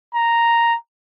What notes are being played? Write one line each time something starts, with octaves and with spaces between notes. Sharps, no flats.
A#5